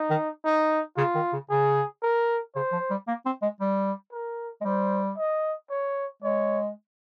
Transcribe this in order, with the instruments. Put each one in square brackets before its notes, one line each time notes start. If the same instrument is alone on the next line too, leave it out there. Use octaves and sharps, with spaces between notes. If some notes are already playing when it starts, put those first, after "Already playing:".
Already playing: [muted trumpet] D#4
[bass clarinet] D#3
[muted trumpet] D#4
[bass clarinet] C#3 [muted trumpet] F4
[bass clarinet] D#3
C#3
[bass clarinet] C#3 [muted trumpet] G#4
[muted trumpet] A#4
[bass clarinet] C#3 [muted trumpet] C5
[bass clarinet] F3
G3
A#3
C4
G#3
G3
[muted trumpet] A#4
[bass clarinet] G#3
[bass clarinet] G3 [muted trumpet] C5
[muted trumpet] D#5
C#5
[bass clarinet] G#3 [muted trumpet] C#5